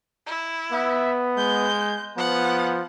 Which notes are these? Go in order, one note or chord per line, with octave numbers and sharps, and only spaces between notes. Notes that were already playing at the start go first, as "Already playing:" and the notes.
E4
B3 E5
G#3 G6
F3 B3 F#5